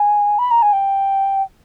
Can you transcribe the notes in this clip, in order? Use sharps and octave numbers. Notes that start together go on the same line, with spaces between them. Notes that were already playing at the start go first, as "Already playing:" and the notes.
Already playing: G#5
B5
A#5
G#5
G5